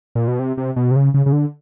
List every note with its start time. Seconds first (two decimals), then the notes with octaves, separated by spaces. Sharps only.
0.15 A#2
0.28 B2
0.39 C3
0.58 C3
0.76 B2
0.91 C3
0.96 C#3
1.14 C#3
1.26 C#3
1.32 D3